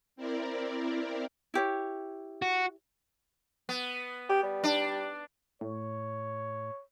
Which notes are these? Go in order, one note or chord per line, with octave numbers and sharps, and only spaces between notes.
C4 E4 A#4 D5
E4 G4 C#5
F#4
B3
G4
G3
D4
A2 C#5